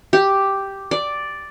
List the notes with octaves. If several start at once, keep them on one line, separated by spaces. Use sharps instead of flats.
G4
D5